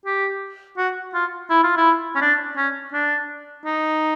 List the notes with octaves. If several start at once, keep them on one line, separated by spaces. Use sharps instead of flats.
G4
F#4
F4
E4
F4
E4
C#4
D4
C#4
D4
D#4